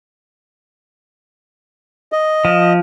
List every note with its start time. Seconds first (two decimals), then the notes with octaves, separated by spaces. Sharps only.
2.12 D#5
2.45 F3